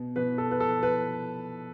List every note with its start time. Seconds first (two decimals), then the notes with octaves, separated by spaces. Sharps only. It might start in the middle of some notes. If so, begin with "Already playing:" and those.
Already playing: B2
0.16 B2 B4
0.38 A4
0.51 B4
0.60 A4
0.83 B4